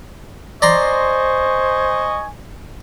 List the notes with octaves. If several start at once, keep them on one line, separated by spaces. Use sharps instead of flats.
C5 D5 D#5 G#5 A#5 C6 C#6